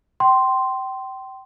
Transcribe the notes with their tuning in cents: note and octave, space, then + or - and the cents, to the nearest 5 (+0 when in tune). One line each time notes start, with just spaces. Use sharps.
G5 -30 C6 +0